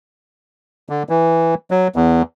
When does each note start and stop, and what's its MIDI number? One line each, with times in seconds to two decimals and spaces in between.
0.89 1.03 50
1.09 1.55 52
1.71 1.88 54
1.96 2.22 40